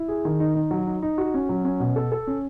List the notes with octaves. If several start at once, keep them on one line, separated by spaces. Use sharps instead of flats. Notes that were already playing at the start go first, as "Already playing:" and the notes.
Already playing: E4
G#4
D#3
D#4
D#4
F#3
D#4
D#4
F#4
C#4
F#3
C#4
B2
A4
A4
C#4